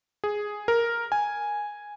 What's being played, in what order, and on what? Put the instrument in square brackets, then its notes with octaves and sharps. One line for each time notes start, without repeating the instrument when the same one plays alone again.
[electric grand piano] G#4
A#4
G#5